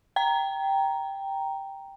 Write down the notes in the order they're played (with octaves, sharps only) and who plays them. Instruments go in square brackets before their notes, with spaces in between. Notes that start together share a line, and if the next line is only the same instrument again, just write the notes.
[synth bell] G5 A#5